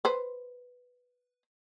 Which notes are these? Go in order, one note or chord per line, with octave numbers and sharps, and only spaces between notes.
B4 C5